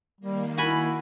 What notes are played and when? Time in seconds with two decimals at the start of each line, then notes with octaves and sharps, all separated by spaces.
0.21 D#3 G3 A#3
0.57 E4 F#4 G#5 B5